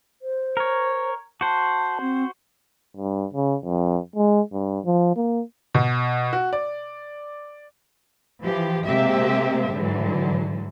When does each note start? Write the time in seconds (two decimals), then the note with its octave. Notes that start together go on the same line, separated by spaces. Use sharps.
0.22 C5
0.57 A#4 C#5
1.41 F#4 C5 A5
2.01 C4
2.97 G2
3.34 C#3
3.64 F2
4.16 G#3
4.53 G2
4.85 F3
5.16 A#3
5.75 B2
6.33 F#4
6.53 D5
8.43 E3 F3 G4
8.87 C3 G#3 A#3 C4 G4 E5
9.72 G#2 D3 E3 F#3